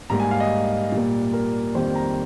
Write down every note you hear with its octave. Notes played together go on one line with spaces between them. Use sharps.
G#2 G3 A#3 A#5
G#5
F5
D#5
A#2 G3 A#3
A#4
F2 D#3 G3 A#3 C5
A#5